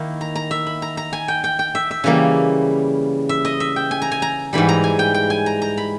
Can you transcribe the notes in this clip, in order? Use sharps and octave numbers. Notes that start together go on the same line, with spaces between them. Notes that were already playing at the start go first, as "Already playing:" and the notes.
Already playing: D#3 A#3 E4
A#5
A#5
E5
B5
A#5
A#5
G#5
G5
G5
G5
E5
E5
C#3 E3 G3 A#3
E5
D#5
E5
G5
G#5
A#5
G#5
A#5
G#2 E3 G3 B5
A#5
G#5
G5
G5
G#5
A#5
A#5
B5